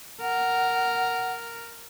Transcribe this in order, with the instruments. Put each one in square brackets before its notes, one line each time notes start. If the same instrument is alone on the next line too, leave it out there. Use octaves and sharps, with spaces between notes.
[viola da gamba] A#4 [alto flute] F#5